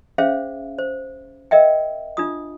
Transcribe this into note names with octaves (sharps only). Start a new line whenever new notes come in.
C#4 G#4 C5 E5 F5
C5
A#4 D#5 E5 G5
D4 F4 D#6